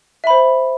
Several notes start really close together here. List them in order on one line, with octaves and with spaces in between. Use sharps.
E5 B5 C5